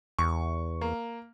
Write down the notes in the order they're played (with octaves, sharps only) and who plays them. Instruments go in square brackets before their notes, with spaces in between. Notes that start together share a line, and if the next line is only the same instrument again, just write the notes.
[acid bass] E2 [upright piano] C#6
[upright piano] A#3